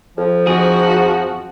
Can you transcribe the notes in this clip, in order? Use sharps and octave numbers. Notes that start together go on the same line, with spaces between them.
F2 F3
F2 G#2 F#4 G#4